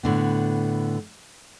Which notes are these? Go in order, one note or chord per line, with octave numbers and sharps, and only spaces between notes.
A2 D3 B3